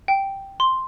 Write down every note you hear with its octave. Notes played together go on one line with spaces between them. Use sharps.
G5
C6